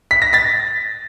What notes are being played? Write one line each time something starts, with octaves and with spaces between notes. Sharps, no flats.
B6
A#6
A6 B6